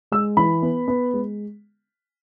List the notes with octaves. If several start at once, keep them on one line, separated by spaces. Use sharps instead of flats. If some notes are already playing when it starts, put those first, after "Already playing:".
G#3 E6
E3 B5
B3
B3
G#3